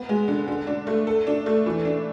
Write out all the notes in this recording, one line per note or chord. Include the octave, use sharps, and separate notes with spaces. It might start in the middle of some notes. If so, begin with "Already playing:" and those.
Already playing: B3
G#3
D3
D3
D4
A3
A4
D4
A3
E3
D4